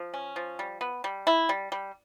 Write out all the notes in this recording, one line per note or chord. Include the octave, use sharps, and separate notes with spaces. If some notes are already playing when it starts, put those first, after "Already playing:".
Already playing: F3
C#4
F3
G3
B3
G3
E4
G3
G3